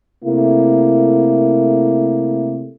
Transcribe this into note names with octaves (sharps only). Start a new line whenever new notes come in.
C3 A3 A#3 E4